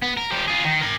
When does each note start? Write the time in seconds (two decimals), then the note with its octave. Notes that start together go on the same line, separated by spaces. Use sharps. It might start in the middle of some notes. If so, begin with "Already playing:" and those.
0.02 B3
0.17 A#4
0.31 F3 G4
0.48 F4 G#4
0.65 D#3
0.81 A#4 G#5